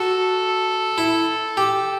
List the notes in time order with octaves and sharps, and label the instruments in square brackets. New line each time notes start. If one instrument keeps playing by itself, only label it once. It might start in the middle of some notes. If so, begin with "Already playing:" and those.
Already playing: [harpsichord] F#4 [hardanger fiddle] A4
[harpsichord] E4
G4